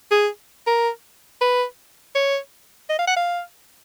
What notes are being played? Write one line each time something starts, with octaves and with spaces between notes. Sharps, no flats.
G#4
A#4
B4
C#5
D#5
F5
F#5
F5